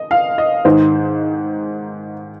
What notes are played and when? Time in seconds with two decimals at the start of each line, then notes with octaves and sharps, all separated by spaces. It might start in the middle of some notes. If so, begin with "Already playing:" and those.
Already playing: D#5
0.11 F5
0.38 D#5
0.65 G#2 D#3 C5